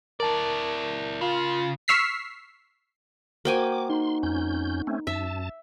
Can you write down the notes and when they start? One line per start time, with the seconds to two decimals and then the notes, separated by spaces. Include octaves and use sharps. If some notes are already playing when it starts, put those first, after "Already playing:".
0.20 E4 A#4 D5 A5
1.21 C#3 F4
1.88 C#6 E6 F6 B6 C7
3.45 A#3 F#4 C5 G5 G#5 D6
3.90 D#4 C6
4.23 F2 C#4 G6
4.87 A3 C4 C#4
5.07 F#2 E5 A5